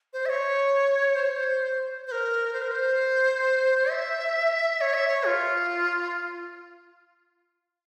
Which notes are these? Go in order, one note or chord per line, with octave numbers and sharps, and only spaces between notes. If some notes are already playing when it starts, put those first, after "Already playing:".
C5
E5
C#5
C5
C#5
C5
C5
A#4
C5
A#4
C5
E5
C#5
E5
C#5
F4